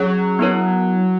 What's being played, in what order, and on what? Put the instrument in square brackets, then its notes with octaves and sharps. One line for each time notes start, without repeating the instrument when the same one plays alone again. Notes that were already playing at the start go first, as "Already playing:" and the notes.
Already playing: [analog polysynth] F#3 [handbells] C#4 G#4 C#5
[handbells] B3 E4 A#4 C#5